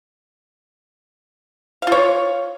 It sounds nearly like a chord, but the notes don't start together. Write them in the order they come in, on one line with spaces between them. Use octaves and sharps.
F5 F4 C#5